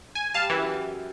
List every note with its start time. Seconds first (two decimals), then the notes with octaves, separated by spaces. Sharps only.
0.15 G#5
0.34 G3 F5 A5
0.50 F#2 E3